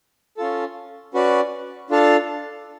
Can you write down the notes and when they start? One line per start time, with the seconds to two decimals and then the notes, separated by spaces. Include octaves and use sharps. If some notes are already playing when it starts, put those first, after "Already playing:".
0.37 C#4 F4 A4
1.14 C#4 F#4 B4 D5
1.90 D4 F4 A4 F5 A5